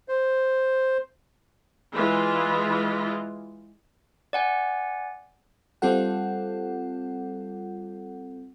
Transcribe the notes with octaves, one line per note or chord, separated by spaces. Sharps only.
C5
E3 G#3 F4
D5 F#5 G#5
G3 C4 F4 A4 F#5